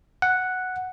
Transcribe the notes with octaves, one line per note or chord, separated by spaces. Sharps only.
F#5